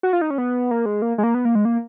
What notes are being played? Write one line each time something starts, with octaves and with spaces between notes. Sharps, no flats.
F#4
F4
D#4
C#4
B3
A#3
G#3
A#3
G#3
A#3
B3
A#3
G#3
A#3